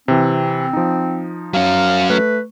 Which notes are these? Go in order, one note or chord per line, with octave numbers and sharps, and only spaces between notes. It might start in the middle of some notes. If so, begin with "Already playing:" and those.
C3 E3 C4
F3 D#4
F#3 C#4 F5
A3 B4